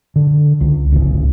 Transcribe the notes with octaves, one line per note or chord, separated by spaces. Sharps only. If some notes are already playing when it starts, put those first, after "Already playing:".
D3
C#2
D1 G1 C#2 C#3